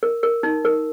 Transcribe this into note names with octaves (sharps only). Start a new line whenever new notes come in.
A#4
A#4
D#4
A#4